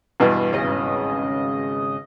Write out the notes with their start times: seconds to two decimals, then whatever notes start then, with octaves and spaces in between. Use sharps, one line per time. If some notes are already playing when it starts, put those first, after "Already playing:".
0.20 E2 G2 B2
0.52 G#1 C#3 D#5